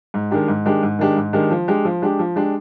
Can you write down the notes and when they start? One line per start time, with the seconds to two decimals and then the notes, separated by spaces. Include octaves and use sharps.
0.14 G#2
0.31 D#3 G#3 D4 G4
0.48 G#2
0.65 D#3 G#3 D4 G4
0.83 G#2
0.99 D#3 G#3 D4 G4
1.17 G#2
1.33 D#3 G#3 D4 G4
1.51 F3
1.68 G#3 D4 G4
1.85 F3
2.02 G#3 D4 G4
2.19 F3
2.36 G#3 D4 G4